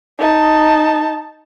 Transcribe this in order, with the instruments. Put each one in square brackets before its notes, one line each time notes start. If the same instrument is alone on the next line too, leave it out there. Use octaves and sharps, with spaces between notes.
[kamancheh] D#4 A5